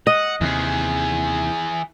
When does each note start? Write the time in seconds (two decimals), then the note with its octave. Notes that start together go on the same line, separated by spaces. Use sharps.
0.07 D#5 F#5
0.41 D#2 C3 E3 G#4